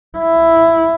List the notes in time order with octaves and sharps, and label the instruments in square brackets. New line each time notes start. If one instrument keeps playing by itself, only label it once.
[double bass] E4